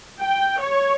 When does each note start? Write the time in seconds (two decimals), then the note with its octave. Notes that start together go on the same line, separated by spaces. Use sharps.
0.19 G5
0.61 C#5